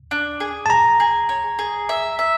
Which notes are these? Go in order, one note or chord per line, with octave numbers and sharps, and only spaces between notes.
D4
G#4
A5
G#4 A#5
G#4
C#5
G#4
E5
E5